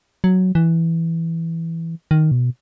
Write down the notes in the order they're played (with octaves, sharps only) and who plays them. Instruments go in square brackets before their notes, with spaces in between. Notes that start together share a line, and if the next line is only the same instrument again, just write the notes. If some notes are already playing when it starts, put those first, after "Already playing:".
[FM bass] F#3
E3
D#3
B2